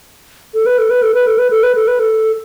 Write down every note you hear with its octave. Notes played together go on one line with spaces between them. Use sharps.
A4
B4
A4
B4
A4
B4
A4
B4
A4
B4
A4
B4
A4